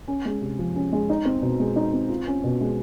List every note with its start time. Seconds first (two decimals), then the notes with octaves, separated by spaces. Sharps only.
0.08 C#4
0.25 G#3
0.41 C3
0.59 F3
0.76 C#4
0.93 G#3
1.10 D#4
1.25 C4
1.42 B2
1.60 G#3
1.76 D#4
1.93 C4
2.09 F4
2.27 C#4
2.44 B2
2.61 G#3